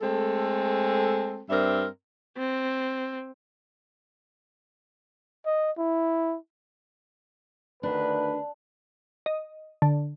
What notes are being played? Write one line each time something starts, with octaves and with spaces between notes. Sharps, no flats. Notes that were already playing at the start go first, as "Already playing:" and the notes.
G#3 A3 C4 A4
G2 C4 A#4 D5 E5
C4
D#5
E4
D2 D#3 D4 B4
D#5
D3